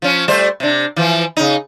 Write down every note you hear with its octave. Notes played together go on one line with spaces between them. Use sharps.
F3 C#4
G3 A3 C5
C3 D4
E3 F3
C#3 D#4